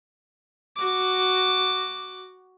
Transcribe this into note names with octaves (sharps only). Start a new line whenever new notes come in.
F#4 D6